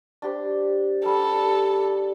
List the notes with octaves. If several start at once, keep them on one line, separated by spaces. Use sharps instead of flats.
D4 G4 C5
G3 A4